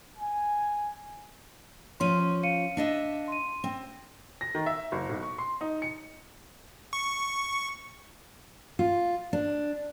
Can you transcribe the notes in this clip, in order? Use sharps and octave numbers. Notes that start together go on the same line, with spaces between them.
G#5
F3 C#4 C6 D#7
F5 C#7 D#7
D4 D#5 E5
C6 D#7
C4
A#6
D#3
E5
F#1
B1
C#6
C6
D#4
C#7
C#6
F4
D4